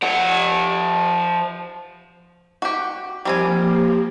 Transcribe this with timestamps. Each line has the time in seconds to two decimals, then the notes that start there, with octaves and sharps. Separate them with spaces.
0.03 F3 F#5
2.62 F#4 G4
3.25 F3 G3 A#3 C4 G4 G#5